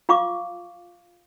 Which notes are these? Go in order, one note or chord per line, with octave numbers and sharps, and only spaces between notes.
F4 F5 C#6 D6